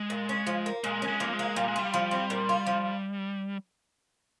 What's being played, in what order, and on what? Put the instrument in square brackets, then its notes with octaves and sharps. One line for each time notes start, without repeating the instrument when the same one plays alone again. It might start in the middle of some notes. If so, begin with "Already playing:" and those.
Already playing: [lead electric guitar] G#3
[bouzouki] A#2
C#4
F3
A#3
[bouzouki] A#2 [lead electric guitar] G#3
[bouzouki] C#4
[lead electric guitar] G#3
[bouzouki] F3 [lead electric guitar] A#3
[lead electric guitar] G#3
[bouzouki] A#3
[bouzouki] A#2 [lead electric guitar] G3
[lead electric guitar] G#3
[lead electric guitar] G3 [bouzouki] F4
[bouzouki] F3
C4
A#2
F4
F3